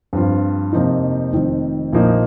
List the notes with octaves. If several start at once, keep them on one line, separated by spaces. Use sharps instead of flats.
G2 F3 C4 F4
F2 C3 F3 A#3 D#4
F1 F2 D#3 C4
A#1 A#2 F3 A#3 D#4